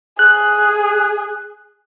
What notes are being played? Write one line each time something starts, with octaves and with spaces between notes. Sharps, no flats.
G#4 F#6